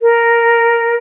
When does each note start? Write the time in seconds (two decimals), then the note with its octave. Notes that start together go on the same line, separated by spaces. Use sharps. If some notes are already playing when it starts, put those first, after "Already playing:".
0.01 A#4